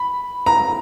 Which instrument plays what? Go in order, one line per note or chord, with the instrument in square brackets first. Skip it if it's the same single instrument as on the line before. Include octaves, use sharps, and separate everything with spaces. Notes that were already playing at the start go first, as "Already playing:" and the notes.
Already playing: [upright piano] B5
A#5